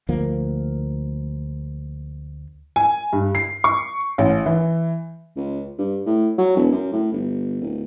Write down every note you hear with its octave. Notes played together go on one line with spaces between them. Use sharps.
D2 F3 A#3
G#5
G2
C7
C#6
A1
E3
C#2
G2
A2
F#3
E1
F#2
A2
G1
D1